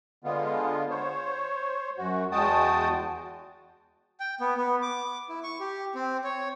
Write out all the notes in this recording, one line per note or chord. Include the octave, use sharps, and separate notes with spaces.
D3 G#3 B3 F4
C5 C#5
F#2 F#4
E2 G#3 F#4 G5 A5 D#6
G5
B3
B3
D6
E4
C#6
G4
C4
C#5